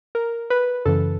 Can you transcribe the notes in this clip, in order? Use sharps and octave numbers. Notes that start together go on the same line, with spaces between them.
A#4
B4
F#2 C#3 E3 A4